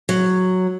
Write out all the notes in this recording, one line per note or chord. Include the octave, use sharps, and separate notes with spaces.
F#3